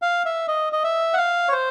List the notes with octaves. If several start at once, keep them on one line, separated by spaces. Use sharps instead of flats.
F5
E5
D#5
D#5
E5
F#5
F5
C#5
C5